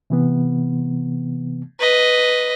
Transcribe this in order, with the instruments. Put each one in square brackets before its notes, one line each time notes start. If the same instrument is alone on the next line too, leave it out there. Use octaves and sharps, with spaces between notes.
[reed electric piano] C3 E3 B3
[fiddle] B4 D#5